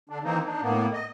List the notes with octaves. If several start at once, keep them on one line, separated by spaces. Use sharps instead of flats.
D3 D4
D#3 E3 A#3 C4 D#4
D4 D#4
A2 A#3 B3
D#5